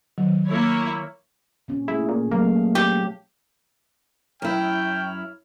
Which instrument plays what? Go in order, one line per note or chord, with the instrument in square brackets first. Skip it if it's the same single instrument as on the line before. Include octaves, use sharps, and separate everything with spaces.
[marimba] D#3 F#3
[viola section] A#3 E4 C#5
[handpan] A#2 C4 C#4
[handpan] A3 G#4 [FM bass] E4
[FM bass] A#2
[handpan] F#3 A3 F5 [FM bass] A#3
[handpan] C4
[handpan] C4 [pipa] G4
[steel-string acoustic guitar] F#2 E4 [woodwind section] C#5 F6 [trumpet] G5